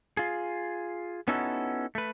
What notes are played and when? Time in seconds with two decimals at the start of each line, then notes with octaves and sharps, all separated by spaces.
0.17 F4 G#4
1.28 B3 C#4 D#4 E4 F#4 A4
1.95 A3 B4